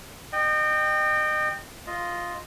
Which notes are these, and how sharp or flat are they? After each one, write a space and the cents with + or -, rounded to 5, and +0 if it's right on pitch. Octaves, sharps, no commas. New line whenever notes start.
D#5 -30 G5 +0
F4 +0 D#5 +0